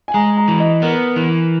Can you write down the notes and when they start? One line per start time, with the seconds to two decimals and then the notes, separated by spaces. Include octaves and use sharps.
0.08 G#5
0.14 G#3 A#5
0.37 A#5
0.48 E3
0.60 D#5
0.82 B3 A#4
1.16 E3